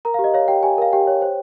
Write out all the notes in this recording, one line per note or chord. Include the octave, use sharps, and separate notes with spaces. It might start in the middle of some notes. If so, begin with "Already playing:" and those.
A#4 A#5
F5
G4
D#5
C#5 F5
G4 G5
G4 G#5
A#4 F5
G4 G5
C#5
C5